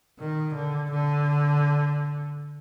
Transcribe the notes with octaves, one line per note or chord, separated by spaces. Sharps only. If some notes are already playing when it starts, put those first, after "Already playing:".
D#3
D3
D3